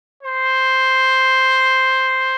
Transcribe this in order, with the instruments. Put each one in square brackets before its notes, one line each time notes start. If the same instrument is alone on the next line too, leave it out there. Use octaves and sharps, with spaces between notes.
[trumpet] C5